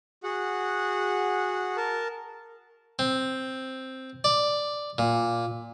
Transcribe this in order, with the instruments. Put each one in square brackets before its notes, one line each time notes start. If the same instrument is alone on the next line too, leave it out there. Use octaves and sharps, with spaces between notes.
[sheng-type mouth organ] F#4 G#4 F#5
A#4 A5
[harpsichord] C4
D5
A#2